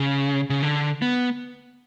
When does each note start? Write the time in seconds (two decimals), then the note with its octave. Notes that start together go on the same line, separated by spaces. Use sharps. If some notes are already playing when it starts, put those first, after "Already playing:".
Already playing: C#3
0.50 C#3
0.63 D3
1.02 B3